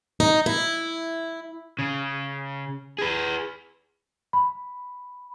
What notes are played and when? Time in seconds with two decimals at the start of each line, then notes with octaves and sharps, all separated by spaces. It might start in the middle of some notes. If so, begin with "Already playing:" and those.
0.20 D#4
0.46 E4
1.79 C#3
2.99 G#4 B4
4.33 B5